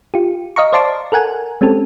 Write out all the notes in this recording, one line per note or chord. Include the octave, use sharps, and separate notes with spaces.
F4 G4
D#5 F5 A#5 C#6
C5 D5 F5 A5 C6 D6
A4 A#4 F#5 G#5
G#3 C4 C#4 G4 A4